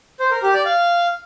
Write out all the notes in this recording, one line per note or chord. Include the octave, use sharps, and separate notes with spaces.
C5
A#4
G4
D5
F5